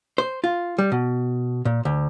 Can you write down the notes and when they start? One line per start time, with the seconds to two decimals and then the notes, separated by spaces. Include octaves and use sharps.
0.18 C5
0.44 F4
0.78 G3
0.92 B2
1.65 A#2
1.85 D2